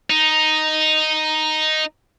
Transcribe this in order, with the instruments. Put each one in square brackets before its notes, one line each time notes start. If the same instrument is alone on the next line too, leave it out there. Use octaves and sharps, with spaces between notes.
[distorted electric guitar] D#4